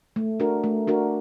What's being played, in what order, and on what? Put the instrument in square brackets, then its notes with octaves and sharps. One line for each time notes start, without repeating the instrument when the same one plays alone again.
[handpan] A3
D4 F#4 A#4
A3
D4 F#4 A#4